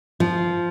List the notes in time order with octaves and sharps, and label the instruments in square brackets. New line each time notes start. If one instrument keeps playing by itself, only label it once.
[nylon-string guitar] F3